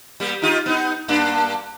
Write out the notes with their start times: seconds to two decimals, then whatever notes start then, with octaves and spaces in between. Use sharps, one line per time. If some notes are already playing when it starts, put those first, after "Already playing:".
0.20 G3 A#3
0.42 D#4 F4 G4
0.66 B3 D#4
1.08 G2 A#3 D4